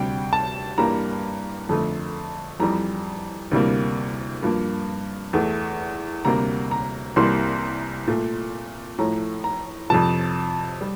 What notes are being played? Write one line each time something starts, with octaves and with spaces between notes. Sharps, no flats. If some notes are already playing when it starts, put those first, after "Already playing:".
Already playing: D2 C3 G3 G5
A5
G2 E3 G3 A#3 A#5
F2 D3 A3
F2 E3 G3 A#5
D2 C3 E3 G3 A#3
G2 F3 A#3
E2 E3 A3
D2 C3 G3 A#3 A#5
A#5
C2 C3 E3 G3 A#3 C6
A#2 A3
A2 F3 A3 A#5
A#5
F2 C3 F3 A5
G3